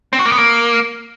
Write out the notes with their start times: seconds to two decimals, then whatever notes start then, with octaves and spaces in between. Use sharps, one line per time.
0.13 C4
0.19 F#4
0.26 A#3
0.32 B3
0.38 A#3